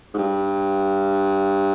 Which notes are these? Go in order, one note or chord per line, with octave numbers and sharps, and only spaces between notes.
G#2
G2